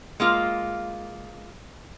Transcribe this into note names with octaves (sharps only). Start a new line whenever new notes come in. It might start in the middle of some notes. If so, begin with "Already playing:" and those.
G#3 A#3 F4